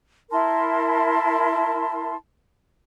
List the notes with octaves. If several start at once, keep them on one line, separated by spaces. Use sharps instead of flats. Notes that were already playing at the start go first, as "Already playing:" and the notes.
E4 A#4 A5 C6